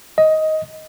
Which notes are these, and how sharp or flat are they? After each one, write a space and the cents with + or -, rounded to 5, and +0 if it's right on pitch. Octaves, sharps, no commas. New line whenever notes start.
D#5 +10